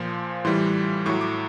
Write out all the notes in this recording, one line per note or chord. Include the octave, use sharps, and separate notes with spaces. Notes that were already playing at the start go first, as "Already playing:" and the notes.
Already playing: A#2 F3 C6
A2 E3 G3 C6
A2 F#3 C#6
D6